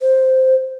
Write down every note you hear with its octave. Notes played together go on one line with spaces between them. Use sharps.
C5